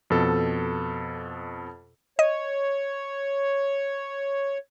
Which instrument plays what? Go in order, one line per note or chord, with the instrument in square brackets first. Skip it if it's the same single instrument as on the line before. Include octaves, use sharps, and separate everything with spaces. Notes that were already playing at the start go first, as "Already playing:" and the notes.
[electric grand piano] F2 B2 A4
[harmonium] C#5 [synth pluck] D#5